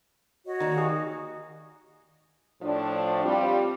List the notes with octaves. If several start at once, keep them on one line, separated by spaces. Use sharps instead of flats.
F#4 C#5 D#5
D#3 A#3 D5 A#5
G4 G#5 D#6
A2 F3 D4
G3 C4 F4